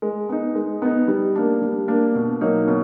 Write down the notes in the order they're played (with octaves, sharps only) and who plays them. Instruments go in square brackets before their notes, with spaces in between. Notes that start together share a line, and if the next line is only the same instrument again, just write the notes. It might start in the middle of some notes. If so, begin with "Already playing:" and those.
[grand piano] G#3
B3 D#4
G#3
B3 D#4
G3
A#3 D4
G3
A#3 D4
B2
F#3 A#3 D#4
B2